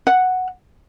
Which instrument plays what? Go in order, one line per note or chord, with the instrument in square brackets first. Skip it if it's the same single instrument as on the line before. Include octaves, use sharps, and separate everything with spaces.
[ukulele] F#5